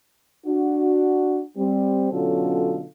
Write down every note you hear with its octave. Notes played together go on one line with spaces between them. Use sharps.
D4 F#4
G3 C4
B2 D3 F#3 C#4 F4 A4